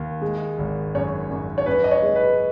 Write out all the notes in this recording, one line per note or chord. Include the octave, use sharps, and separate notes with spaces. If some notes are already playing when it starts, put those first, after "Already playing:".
Already playing: D#2
G#3
G#1
F#2 C#5
F#2
C#5
F#2 B4
D#5
C#5
G#3
B4